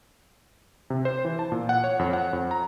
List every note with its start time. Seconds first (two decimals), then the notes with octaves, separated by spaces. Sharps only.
0.90 C3
1.05 C5
1.25 E3
1.39 A5
1.52 A#2
1.69 F#5
1.84 C#5
1.99 F2
2.13 F#5
2.33 F2
2.51 A#5